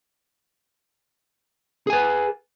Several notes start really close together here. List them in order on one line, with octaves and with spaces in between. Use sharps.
G#4 G#5 B4